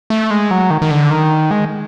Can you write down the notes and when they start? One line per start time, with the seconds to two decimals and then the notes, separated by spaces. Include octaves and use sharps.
0.10 A3
0.31 G#3
0.51 F#3
0.70 D#3
0.82 D#3
0.91 D3
1.10 D#3
1.51 G#3